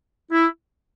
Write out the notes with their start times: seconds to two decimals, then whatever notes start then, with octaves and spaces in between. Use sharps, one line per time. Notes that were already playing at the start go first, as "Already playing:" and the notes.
0.31 E4